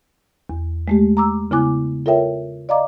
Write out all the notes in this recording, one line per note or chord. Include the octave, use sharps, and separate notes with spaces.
E2
G#3 A3 G4
A#5 D6 E6
C#3 B3 E4 G#5 D6 F#6
F4 A4 A#4 C#5 E5 G5
D5 D#5 F5 A#5 D6